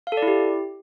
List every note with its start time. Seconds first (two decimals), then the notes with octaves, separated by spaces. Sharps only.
0.07 F5
0.12 A4
0.17 D5
0.22 E4
0.28 G4